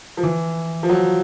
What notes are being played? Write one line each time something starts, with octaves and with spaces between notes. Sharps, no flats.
F3
E3
F3
F#3